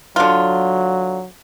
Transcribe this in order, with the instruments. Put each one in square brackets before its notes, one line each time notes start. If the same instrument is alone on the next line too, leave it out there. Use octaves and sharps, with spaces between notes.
[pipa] D3 F4 [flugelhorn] F#3